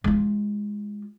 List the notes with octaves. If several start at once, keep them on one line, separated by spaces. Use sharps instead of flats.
G#3 F4